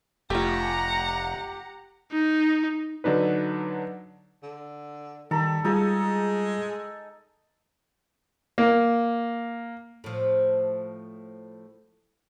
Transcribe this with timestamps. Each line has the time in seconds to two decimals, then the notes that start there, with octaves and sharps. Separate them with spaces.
0.30 F1 A3 F4 G4 F#5 A#5
2.12 D#4
3.04 D3 F#3 D4 D#4 B4
4.43 D3
5.31 D#3 G3 A4 A#5
5.64 G3 G#3 D#4 F4 G#4 A4 G#5
8.58 A#3
10.04 A2 F3